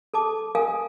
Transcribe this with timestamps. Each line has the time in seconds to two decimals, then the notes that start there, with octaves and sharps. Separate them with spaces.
0.14 A4 A5 D6
0.55 A#4 F5 G#5 D#6